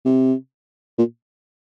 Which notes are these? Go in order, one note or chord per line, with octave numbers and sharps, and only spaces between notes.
C3
A#2